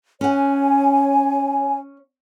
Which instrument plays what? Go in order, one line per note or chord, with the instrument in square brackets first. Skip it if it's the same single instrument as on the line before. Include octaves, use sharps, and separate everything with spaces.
[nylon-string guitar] C#4 F#5 [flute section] C#5 G#5